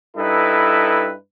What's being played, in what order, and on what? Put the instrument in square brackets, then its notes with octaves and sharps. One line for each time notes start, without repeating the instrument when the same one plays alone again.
[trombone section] G2 D#4 E4 A4 B4